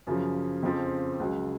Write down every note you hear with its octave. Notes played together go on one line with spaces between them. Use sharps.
F#2 C#3 F3
F2 C#3 F3 C4
C#2 C#3 F#3